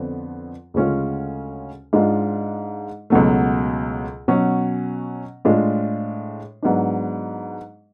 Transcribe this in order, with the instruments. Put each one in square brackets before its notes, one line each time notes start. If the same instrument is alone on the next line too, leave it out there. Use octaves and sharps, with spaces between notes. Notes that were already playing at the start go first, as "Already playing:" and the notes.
Already playing: [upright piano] F2 D3 F3 B3
D2 C#3 G#3 C#4 F4
G#2 G#3 D4 F4
C#2 B2 F#3 A3
B2 F#3 C#4
A2 G#3 D4 F4
G#2 F#3 B3 D4